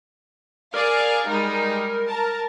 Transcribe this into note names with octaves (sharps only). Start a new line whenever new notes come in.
G#4 A#4 D5 F5
G3 G#3 D#4
A5 A#5